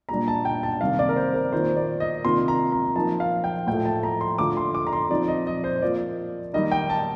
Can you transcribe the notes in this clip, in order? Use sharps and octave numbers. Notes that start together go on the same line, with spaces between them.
A#2 G3 D4 A#5
A5
G5
A5
C3 D#3 G3 F5
D5
A#4
C5
A#4
D#3 A#3 F4 C5
D5
D#5
C3 D#3 A#3 F4 C6
A#5
A#5
F3 A#3 D#4 A5
F5
G5
A2 F3 A3 G5
A5
A#5
C6
D3 A3 D4 F4 D6
C6
D6
A#5
C6
F3 C4 D#4 D5
D#5
D#5
C5
F3 A#3 F4 D5
D#3 G3 A#3 D#4 D#5
G5
A5